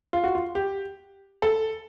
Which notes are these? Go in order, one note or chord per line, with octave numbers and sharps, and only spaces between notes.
F4
F#4
F4
G4
A4